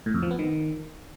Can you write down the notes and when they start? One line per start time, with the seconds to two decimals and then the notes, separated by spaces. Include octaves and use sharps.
0.06 A2
0.14 F2
0.22 F3
0.31 B3
0.39 D#3